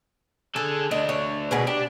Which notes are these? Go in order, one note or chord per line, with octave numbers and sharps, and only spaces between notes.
D3 G#4 A4
D2 D4 D#5
C#5
B2 G#4 B4
D4 G4